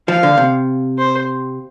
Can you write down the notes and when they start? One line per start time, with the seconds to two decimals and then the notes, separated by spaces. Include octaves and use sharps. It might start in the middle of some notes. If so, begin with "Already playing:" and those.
0.08 F3 F5
0.23 D3
0.37 C3
0.98 C5